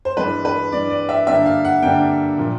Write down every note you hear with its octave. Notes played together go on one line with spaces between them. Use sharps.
C5
G2 E3 G#3 B4
B4
G2 E3 G#3 D5
D5
E5
G2 D3 G3 A#3 E5
F5
F#5
G2 D3 G3 A#3 G5
A#2 F3 A#3